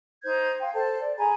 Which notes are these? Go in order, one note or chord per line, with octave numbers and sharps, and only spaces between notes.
D#4 C5 G6 G#6
F5 G5 C6
A4 C5 A5
D5
G#4 G#5 A#5 B5